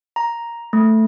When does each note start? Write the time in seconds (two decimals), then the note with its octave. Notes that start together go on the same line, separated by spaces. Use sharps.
0.16 A#5
0.73 A3